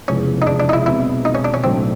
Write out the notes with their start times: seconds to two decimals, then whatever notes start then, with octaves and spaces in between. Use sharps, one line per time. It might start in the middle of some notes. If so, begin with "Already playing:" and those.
0.08 F1 E2 C#3 F3 G#3 C#4
0.42 D#4
0.47 D4
0.60 D4
0.69 D#4
0.73 E4
0.86 B1 B2 G#3 C4 E4
1.25 D#4
1.35 C#4
1.45 D4
1.54 C#4
1.64 B1 A2 F#3 A3 C4 D4